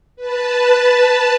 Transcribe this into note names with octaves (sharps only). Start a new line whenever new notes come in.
B4 A5